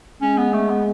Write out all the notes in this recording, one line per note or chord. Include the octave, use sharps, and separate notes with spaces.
G#3 C#4
B3
A3
B3